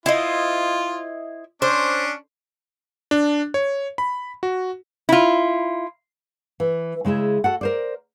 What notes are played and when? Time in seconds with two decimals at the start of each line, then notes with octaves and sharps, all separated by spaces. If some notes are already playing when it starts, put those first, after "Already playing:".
0.06 E4 F4 C5 D#5
1.62 C#4 D4 C5
3.11 D4
3.54 C#5
3.98 B5
4.43 F#4
5.09 E4 F4
6.60 E3
7.05 C#3 G#3 E4 E5
7.44 F#4 A4 F#5
7.61 A#4 C5 D5